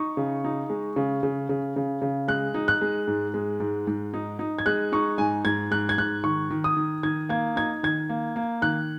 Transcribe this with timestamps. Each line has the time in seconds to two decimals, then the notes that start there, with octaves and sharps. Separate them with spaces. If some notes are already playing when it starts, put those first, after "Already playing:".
Already playing: D#4 C#6
0.17 C#3
0.44 D#4
0.70 G#3
0.96 C#3
1.23 C#3
1.49 C#3
1.76 C#3
2.02 C#3
2.28 G#3 F#6
2.54 D#4
2.68 F#6
2.81 G#3
3.07 G#2
3.34 G#3
3.60 G#2
3.87 G#2
4.14 D#4
4.39 D#4
4.59 G#6
4.66 G#3 F#6
4.92 D#4 C#6
5.18 G#2 G#5
5.45 G#2 G#6
5.71 G#2 F#6
5.89 G#6
5.98 G#2 F#6
6.24 D#3 C#6
6.51 D#3
6.64 D#6
6.77 D#3
7.03 D#3 G#6
7.29 A#3 G#6
7.56 D#4 G#6
7.83 D#3 G#6
8.09 A#3
8.36 A#3
8.62 D#3 F#6